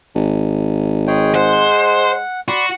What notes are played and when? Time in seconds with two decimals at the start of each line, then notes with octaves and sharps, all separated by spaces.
0.15 G#1
1.08 G#3 G#4 C#5 G5
1.35 C5 F#5
2.48 F#4 D5 B5 C6